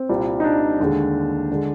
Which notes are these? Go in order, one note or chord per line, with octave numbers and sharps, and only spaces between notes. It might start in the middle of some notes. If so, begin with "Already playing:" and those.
Already playing: C4
C2 A#2 G3
D#4
D4
D#2 D3 G#3
D3 G#3